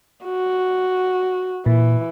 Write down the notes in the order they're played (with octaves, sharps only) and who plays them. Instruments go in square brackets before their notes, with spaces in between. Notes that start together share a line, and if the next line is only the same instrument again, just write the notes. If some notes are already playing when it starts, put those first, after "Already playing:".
[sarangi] F#4
[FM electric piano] A#2 [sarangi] E3